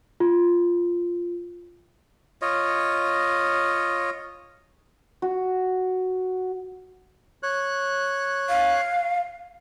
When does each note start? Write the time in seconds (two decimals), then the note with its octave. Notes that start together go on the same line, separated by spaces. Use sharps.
0.20 F4
2.42 F4 C#5 D#5
5.22 F#4
7.43 C#5 F#6
8.49 F5